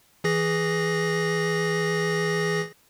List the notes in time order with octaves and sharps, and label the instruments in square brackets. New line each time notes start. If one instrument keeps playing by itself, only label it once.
[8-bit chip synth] E3 G#4 A#6